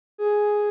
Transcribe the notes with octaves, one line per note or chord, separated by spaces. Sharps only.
G#4